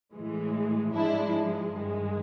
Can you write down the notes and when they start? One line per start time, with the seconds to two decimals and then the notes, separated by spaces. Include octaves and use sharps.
0.14 A2 E3 G#3
0.94 G#2 F3 G#3 D4 E4
1.75 G2 D#3 G#3